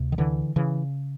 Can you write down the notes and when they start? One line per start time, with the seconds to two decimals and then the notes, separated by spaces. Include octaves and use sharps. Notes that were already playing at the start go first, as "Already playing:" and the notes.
Already playing: D2 C3
0.12 D#3
0.18 D3 E3
0.56 C#3 E3